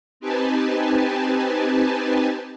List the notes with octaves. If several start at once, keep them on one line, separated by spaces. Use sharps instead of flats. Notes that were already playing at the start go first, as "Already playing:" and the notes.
C4 D#4 G4 B4 G#5 A5